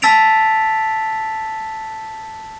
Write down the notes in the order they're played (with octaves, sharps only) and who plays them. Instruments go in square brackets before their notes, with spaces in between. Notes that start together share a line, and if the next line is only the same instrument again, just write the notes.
[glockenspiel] A5 E6 A6 B6 D7 F7